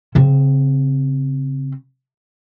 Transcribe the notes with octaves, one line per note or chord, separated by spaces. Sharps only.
C#3 C4